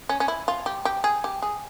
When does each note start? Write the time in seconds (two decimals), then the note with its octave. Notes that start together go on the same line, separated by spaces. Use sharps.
0.09 C#4
0.20 C#4
0.28 E4
0.48 F4
0.66 G4
0.85 G4
1.04 G#4
1.24 G4
1.42 G#4